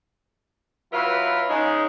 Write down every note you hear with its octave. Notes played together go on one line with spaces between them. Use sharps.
F#3 E4 F4 B4
C#3 G#3 D#4